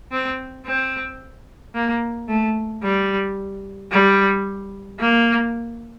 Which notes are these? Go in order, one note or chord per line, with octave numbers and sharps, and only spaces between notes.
C4
C4
A#3
A3
G3
G3
A#3